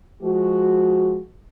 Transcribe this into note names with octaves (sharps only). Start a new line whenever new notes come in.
F3 G#3 F#4